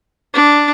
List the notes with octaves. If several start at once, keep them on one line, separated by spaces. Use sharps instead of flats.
D4